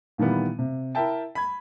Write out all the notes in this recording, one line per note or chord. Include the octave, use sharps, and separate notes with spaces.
A#2 D#3 E3 G3 B3
C3
E4 A#4 E5 G5 A5
B5 G#6